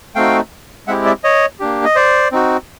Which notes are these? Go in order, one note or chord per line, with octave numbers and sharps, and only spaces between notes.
A3 C4 D#4 F#4 F5 G5
G#3 C4 E4 G4 E5 F#5
D5 E5
C#5 D#5
A#3 D4 G4
D#5
C5 D5
C4 D#4 F#4